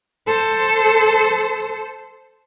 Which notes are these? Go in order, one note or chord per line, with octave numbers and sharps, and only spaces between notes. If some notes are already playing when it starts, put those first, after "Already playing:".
A4 C5